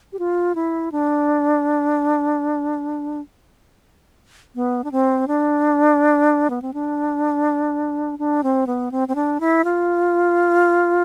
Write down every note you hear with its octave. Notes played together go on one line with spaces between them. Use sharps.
G4
F4
E4
D4
B3
D4
C4
D4
B3
C4
D4
D4
C4
B3
C4
C4
D4
E4
F4